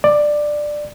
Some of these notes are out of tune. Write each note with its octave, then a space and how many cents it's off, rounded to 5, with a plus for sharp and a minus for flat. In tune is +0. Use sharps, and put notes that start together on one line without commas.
D5 +10